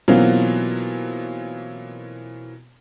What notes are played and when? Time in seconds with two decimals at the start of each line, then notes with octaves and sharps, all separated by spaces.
0.08 B2 E3 F#3 A#3 C4 F4